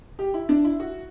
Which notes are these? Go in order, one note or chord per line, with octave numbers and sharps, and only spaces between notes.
G4
E4
D4
E4
F#4